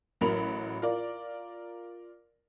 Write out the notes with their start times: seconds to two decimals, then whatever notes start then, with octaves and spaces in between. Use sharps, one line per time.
0.21 A1 F#3 A#4 B5 F7
0.82 F4 A#4 D5